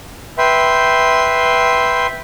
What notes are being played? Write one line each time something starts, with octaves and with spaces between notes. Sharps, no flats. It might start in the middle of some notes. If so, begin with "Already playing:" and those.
B4 E5 G5 C6